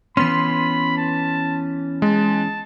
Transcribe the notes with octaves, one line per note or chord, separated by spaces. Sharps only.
E3 B3 C#4 B5 C6
A5
G#3 A5